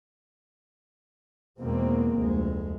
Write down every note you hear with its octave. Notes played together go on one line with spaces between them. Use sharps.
E2 B2 G#3 A#3 C4
F1 D2 G#3